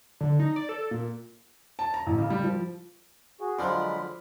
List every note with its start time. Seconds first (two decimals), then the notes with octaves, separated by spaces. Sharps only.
0.21 D3
0.40 D#4
0.56 D5
0.69 A4
0.91 A#2
1.79 A5
1.94 A#5
2.06 A1
2.18 C#3
2.30 G3
2.44 F3
3.40 F#4 G#4
3.59 D3 F3 F#3 G#3 B5